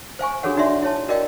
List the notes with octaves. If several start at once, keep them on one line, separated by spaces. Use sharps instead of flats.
C5 F5 G#5 C#6
D4 F#4 G#4 A4 C#5 F#5
D4 D#4 F#4 D5 E5 C6
E4 C#5 A5
F#4 A#4 D5 D#5 F5 G5